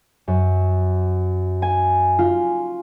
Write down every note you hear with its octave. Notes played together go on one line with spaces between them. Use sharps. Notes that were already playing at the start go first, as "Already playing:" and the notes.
F#2
G#5
F4